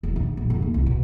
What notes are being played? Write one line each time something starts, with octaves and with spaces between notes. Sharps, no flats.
E1
D3
A#1
F1
A#3
C2
B2